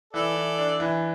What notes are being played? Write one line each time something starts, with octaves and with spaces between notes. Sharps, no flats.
E3 A4 D5
E3
D4
E3